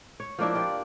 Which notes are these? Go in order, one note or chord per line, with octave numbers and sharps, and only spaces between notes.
C#5
F3 A#3 D4 E4
F4 G4 D5